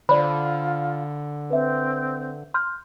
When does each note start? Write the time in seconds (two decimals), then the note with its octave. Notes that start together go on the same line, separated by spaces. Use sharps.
0.09 D3 F4 C5 D5 B5
1.50 C4 B4 E5
2.54 C6 F6 G6